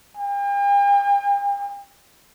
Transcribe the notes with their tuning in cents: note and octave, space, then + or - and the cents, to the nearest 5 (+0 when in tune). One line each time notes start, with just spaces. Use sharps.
G5 +45